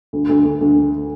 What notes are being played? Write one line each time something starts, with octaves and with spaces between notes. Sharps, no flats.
D2
D2
D2
D2
D3